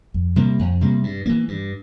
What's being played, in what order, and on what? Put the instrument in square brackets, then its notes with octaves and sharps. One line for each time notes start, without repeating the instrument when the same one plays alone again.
[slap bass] F2
C3 G3 A#3
F2
C3 G3 A#3
G2
E3 A#3
G2